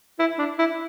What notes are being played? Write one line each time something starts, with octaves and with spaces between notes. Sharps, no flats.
E4
D4
E4